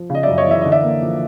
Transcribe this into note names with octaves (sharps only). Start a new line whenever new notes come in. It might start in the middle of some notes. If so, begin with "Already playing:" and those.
Already playing: F3
C#3 D#5
F#2 D5 E5
C#5 D#5
E3 E5
D3 D#5
D5 E5
A#3
F3